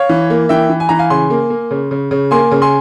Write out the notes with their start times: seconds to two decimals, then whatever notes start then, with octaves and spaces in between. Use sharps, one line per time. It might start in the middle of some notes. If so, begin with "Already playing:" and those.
Already playing: C#5 F5
0.09 E3
0.30 A#3
0.49 E3 E5 G5
0.70 E3
0.80 G#5
0.89 E3 A#5
0.99 F5 G#5
1.10 C#3 G#5 C6
1.30 A#3
1.50 A#3
1.71 C#3
1.91 C#3
2.11 C#3
2.31 A#3 G#5 C6
2.51 C#3
2.62 G#5 C6